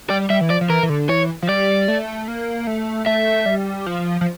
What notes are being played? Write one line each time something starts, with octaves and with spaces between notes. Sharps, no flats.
G3 D5
G3 E5
E3
F3 D5
F3
E3 A#4
E3
D3
E3 C#5
F3
G3 D5
A3
A#3
A3
A3 E5
G3
F3
F3